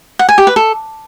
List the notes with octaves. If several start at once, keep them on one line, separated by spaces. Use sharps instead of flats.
F#5
G#5
G4
B4
A4